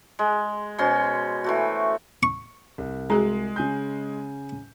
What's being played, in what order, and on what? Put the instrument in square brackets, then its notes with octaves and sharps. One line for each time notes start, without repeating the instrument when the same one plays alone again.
[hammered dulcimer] G#3
B2 C#4 C5 C6
E3 A3 F#4
[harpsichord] C#6
[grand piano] C2
[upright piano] G#3 [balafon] F#4 G#4 A#5
[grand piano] C#3 G#5 G6